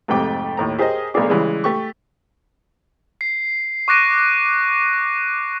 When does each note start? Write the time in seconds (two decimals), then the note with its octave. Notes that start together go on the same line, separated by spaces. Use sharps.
0.08 F2 G#2 C3 A3 G5 D6
0.57 D#2 A2 A#5
0.79 G4 G#4 A#4 C5 D#5
1.14 B1 A3 A#3 D4 G#4 D6
1.30 C#3 E3 G3 G#3
1.64 A3 G4 C#6
3.21 C7
3.88 C#6 D6 F#6 A#6 D7 D#7